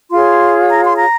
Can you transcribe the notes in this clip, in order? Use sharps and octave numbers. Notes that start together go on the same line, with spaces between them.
F4 G#4 C#5 C6
A#5
C6
A#5